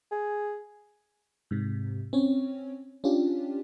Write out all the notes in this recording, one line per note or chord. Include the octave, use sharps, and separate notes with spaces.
G#4
G#2 C3
C4 C#4 C#5
C#4 D4 F4 G4